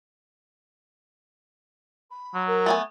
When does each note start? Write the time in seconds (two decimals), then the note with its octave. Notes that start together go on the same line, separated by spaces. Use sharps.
2.10 B5
2.34 F#3
2.47 A#4
2.66 A3 B3 G#5